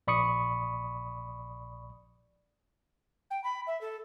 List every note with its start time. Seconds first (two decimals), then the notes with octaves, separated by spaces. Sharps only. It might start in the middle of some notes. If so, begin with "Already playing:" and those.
0.07 A#1 D5 B5 C#6 D#6 C#7
3.31 G5
3.44 B5
3.67 E5
3.81 A4